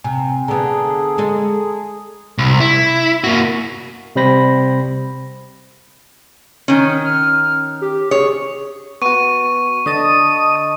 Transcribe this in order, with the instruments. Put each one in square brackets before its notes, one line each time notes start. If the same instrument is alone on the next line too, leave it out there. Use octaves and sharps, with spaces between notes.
[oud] C3 [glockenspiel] G#5
[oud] D3 B3 [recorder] G#4 [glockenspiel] A5 A#5
[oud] G#3 A4 D#5
[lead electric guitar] C2
E4
A#3 F#4
[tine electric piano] C3 G3 C4 C5 B5 A#6
[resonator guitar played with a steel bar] D#3 C#4
[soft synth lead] F6
G4
[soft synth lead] G#4 [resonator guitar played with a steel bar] C#5
[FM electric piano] B3 F#4 [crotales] C#6 D#7
[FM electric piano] D3 D#5 A5 [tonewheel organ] D#6